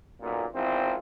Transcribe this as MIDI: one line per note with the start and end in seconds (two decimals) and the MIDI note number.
0.20 0.45 35
0.20 0.45 42
0.20 0.45 46
0.54 0.95 32
0.54 0.95 40
0.54 0.95 52
0.54 0.95 60
0.54 0.95 65